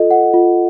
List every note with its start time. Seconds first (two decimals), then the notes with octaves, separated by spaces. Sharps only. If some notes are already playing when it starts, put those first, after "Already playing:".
Already playing: F4 A4 D#5
0.11 F#5
0.34 F4